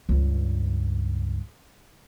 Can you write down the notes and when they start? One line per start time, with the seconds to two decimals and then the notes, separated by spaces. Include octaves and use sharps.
0.09 C#2 G2